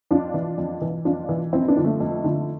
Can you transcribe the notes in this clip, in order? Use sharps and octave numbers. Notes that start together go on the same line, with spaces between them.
F2 D4 F4
E3
F2
E3
F2 D4 F4
E3
F2 C4 E4
B3 D4
D3 F3
A3
F2
D3 F3